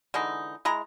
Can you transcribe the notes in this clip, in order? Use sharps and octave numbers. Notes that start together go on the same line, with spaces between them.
D3 E3 G#3 D#4
G#3 E4 A#5